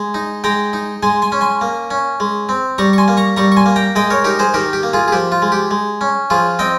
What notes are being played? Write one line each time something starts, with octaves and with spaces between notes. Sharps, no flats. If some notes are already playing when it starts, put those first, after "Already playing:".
Already playing: G#3
D#4
G#3 G5 A#5
D#4
G#3 G#5 C6
G#5 C6
C#4
G#5 C6
A#3
C#4
G#3
C4
G3 A#5 C#6
C#6
G#5 C6
A#3
A#5 C#6
G3 A#5 C#6
C#6
G#5 C6
A#3
G5 A#5
G#3 D#5 G5
A#4 C#5
D#4 G4 A#4
G#4 C5
D#3 G4 A#4
G4
A#3
F4 G#4
G#4
F3 G4
F4
G#3
G4
G#3
C#4
F3 F4 G#4
C4 D#5 G5